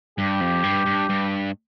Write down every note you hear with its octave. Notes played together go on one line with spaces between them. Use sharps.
G2 G4
F2
G2
G2
G2